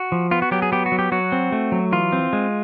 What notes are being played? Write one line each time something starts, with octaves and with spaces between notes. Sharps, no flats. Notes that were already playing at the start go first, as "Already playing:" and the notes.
Already playing: F#4
F3
B3 F4
F#4
F#3 G4
G#4
B3 G4
F#4
F#3
G4
F#3 F#4
C4
A3
F#3
E3 F4
C4
G#3